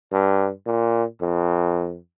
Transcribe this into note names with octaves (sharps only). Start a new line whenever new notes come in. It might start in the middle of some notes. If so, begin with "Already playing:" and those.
G2
A#2
F2